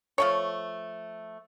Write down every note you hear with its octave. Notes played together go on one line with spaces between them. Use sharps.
F3 A3 C#5